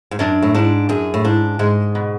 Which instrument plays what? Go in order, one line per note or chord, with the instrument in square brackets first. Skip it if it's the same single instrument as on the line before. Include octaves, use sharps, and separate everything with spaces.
[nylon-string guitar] G#2
[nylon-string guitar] F#2 [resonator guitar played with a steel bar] D4
[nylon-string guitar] A2
[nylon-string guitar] G#2 [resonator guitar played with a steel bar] D4
[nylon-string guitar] F#2 [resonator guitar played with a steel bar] G#4
[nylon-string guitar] A2
[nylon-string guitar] G#2 [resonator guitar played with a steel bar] D4
[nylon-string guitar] G#2 [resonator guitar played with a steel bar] G#3
[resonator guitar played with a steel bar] B2